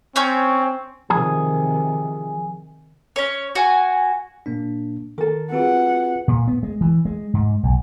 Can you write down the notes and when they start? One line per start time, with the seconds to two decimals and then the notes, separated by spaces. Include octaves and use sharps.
0.16 C4 C#4 C#5 G6
1.10 C3 D#3 F3 G#4
3.16 C#4 C#5
3.55 F#4 G#5
4.46 A#2 A#3 D4
5.18 D#3 A4 A#4
5.52 C4 F4 F#4 G#4 B4 F#5
6.28 A#2
6.48 B3
6.63 G#3
6.81 E3
7.05 G#3
7.34 G#2
7.63 B1